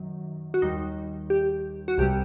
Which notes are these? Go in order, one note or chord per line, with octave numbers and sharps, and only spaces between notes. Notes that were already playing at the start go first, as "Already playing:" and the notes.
Already playing: F#2 D#3 F#3
F#4
D#2 D#3 G3 D#4
G4
F#4
C2 C3 G3 G4